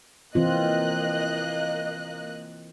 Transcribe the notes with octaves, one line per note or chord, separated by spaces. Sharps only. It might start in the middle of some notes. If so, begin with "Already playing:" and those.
E3 A#3 C4 F4 D#5 F#6